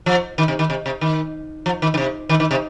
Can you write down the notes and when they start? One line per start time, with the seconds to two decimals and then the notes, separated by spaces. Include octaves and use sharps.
0.06 F3
0.38 D#3
0.48 C3
0.59 D#3
0.70 C3
0.86 C3
1.01 D#3
1.66 F3
1.82 D#3
1.94 D#3
1.97 C3
2.29 D#3
2.40 D#3
2.51 C3